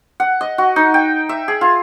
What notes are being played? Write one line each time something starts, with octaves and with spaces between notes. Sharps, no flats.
F#5
D#5
F#4
D#4
G5
E5
G#4
F4